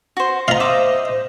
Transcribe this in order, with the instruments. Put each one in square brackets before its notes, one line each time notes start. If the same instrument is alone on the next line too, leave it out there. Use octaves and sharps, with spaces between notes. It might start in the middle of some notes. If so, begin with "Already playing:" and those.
[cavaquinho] F#4 C5
[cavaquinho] F4 [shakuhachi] C5 [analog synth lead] D#5 [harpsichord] F5 A#5
[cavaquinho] E5 D6